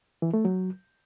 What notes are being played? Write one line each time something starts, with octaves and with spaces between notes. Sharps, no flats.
E3
A3
F#3